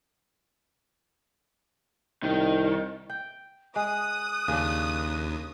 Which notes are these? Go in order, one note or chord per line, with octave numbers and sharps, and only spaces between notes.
C2 D#3
G5
G#3 D#6 F#6
D#2 C#3 D4